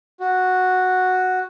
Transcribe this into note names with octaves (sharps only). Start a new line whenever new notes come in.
F#4